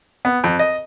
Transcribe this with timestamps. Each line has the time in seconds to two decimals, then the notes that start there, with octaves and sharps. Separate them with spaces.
0.25 B3
0.44 F2
0.59 D#5